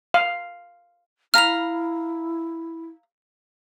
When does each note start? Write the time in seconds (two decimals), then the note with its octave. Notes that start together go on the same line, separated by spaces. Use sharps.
0.14 F5
1.34 E4 F5 A#5 B5 F6 F7